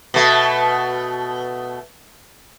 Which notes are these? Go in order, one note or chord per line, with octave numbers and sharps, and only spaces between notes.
B2 A3